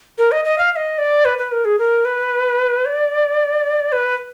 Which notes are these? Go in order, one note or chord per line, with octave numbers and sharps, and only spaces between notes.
A#4
D#5
D#5
F5
F5
D#5
D5
B4
B4
A#4
G#4
A#4
B4
D5
B4